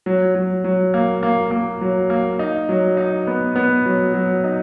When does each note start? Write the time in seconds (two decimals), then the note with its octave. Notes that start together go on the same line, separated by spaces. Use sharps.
0.06 F#3
0.35 F#3
0.64 F#3
0.94 A#3
1.23 A#3
1.51 A#3
1.81 F#3
2.10 A#3
2.39 D#4
2.69 F#3
2.97 D#4
3.27 B3
3.56 B3
3.86 F#3
4.14 F#3
4.44 D#4